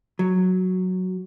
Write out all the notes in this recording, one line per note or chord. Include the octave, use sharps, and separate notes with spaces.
F#3